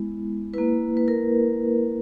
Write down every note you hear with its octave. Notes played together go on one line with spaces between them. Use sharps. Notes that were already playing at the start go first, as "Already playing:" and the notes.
Already playing: G#3 B3 E4
A#3 E4 B4
B4
A#4